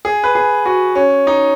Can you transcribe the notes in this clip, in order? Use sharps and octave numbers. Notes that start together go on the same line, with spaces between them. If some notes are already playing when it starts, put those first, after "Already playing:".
G#4
B4
G#4
F#4
C#4
D#4